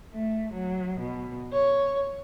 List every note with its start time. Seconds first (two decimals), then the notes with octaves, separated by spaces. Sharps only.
0.12 A3
0.53 F#3
1.01 B2
1.53 C#5